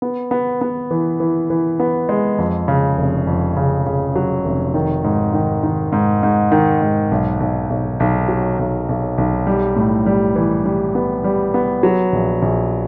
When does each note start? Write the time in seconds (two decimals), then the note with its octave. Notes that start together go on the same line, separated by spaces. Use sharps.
0.02 B3
0.31 B3
0.61 B3
0.91 E3
1.20 E3
1.50 E3
1.80 B3
2.09 G#3
2.38 F2
2.68 C#3
2.98 F1
3.27 F2
3.57 C#3
3.86 C#3
4.16 F#3
4.45 F1
4.74 D#3
5.04 G#2
5.34 D#3
5.63 D#3
5.92 G#2
6.23 G#2
6.52 D#3
6.82 G#2
7.11 B1
7.40 B1
7.70 B1
8.00 B1
8.28 F#3
8.59 B1
8.89 B1
9.18 B1
9.47 G3
9.76 A2
10.06 G3
10.35 E3
10.66 G3
10.95 B3
11.24 G3
11.54 B3
11.83 F#3
12.12 A#1
12.42 A#1